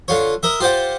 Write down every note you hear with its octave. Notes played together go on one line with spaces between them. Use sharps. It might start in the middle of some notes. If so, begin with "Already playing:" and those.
D3 F4 C#5
A#4 D#5 E5
F4 G4 C5 D5 F#5